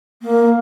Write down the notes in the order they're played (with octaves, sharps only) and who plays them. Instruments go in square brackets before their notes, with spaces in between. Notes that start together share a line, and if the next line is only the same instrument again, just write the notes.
[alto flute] A#3